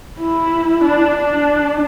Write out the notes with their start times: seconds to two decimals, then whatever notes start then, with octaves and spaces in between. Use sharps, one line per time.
0.20 E4
0.85 D4
1.16 D4